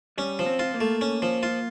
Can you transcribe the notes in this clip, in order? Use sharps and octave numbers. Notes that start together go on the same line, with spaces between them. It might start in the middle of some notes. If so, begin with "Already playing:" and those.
G3 C#4
F3
C4
F4
A#3
A3
C#4
F3
F4